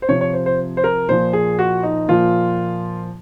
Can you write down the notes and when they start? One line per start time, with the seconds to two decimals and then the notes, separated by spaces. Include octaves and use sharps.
0.02 C5
0.09 C3 F3 C#5
0.21 C#5
0.33 C5
0.46 C5
0.77 C5
0.84 A#4
1.09 A#2 F3 C5
1.33 G#4
1.59 F#4
1.83 D#4
2.08 A#2 F3 F4